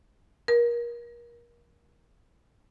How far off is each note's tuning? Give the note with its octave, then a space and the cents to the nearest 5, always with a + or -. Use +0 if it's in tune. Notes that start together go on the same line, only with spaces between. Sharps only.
A#4 +30